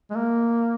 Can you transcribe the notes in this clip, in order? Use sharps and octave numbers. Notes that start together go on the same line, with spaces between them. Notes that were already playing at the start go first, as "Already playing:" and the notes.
G#3
A#3